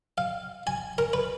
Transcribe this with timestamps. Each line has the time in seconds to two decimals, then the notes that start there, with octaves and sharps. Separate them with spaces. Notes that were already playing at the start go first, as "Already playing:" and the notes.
0.18 F5
0.67 G#5
0.98 A#4
1.13 B4